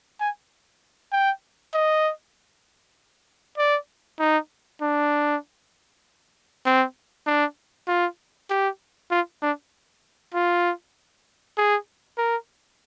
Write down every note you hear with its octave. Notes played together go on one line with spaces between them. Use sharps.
G#5
G5
D#5
D5
D#4
D4
C4
D4
F4
G4
F4
D4
F4
G#4
A#4